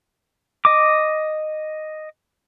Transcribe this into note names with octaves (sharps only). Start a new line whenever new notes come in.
D#5 D6